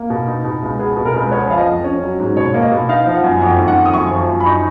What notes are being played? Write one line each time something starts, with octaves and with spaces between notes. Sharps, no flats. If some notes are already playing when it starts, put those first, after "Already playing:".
Already playing: A#3
B2
D#4
B2
C#2
B3 G#4
B2
A#4
C#2
B4
B3 C#5
F3 F5
D#5
F2
C#4
F#3
G#2
B2 C#5
A#3
D#5
B2
D#4 F5
F3 F5
F#5
F#2
F2 F#5
D#3
F#5
F2
D#6
F#2 C#6
F3
F#2
B5
D#4 C#6